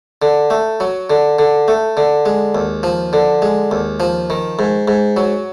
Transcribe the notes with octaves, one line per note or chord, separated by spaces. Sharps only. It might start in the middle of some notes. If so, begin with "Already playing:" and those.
D3
A3
F#3
D3
D3
A3
D3
G#3
D#2
F3
D3
G#3
D#2
F3
D#3
G#2
G#2
F#3